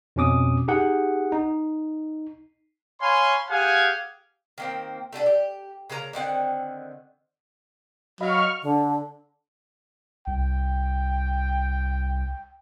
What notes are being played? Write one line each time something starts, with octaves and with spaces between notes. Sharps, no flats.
F2 B2 C#4 D6 D#6
D#4 G4 G#4 F#5
D#4
C#5 F5 G#5 B5 C6
G4 G#4 F5 F#5 G#5
D#3 A#3 C4
A3 D4 F#4 A4
G4
C#3 A#3 B4 A#5
D3 D#3 C4 F#5
F#3 D#5 F5 B5 C#6 F6
D3
C2 G5